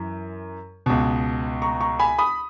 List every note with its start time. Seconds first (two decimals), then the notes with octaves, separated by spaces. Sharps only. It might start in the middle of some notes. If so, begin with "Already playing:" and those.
Already playing: F#2 E3
0.86 C#2 B2
1.62 A#5 C#6
1.81 A#5 C#6
1.99 G#5 B5
2.19 B5 D#6